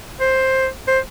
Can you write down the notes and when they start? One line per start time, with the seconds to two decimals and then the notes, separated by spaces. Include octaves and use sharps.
0.20 C5
0.88 C5